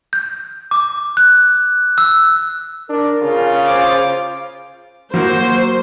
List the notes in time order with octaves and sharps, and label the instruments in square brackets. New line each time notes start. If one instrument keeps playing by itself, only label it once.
[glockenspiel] G6
D6
F#6
E6
[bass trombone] D4 [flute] A#4
[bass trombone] C#3 [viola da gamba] F4
[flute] C5 [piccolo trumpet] D6
[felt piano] F#3 A#3 F#4 [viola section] C5